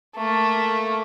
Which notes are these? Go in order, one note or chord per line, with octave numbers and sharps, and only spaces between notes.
A3 A#3